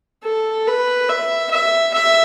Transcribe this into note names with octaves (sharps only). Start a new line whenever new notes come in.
A4
B4
E5
E5
E5